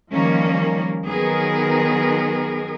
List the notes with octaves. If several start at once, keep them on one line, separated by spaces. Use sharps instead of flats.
D#3 F3 G3 A#3 C#4
D#3 F#3 B3 G#4 A#4